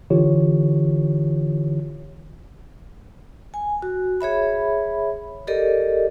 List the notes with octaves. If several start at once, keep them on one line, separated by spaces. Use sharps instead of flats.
D3 E3 F4 G4 C#5
G#5
F#4
G#4 C#5 E5 B5
G4 A4 A#4 D5 D#5